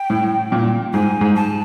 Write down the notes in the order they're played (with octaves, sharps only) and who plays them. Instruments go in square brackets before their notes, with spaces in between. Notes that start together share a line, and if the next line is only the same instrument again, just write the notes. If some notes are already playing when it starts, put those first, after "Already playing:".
Already playing: [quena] G5
[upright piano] A2
A#2
[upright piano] G#2 [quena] G#5
[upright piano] G#2
[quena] A5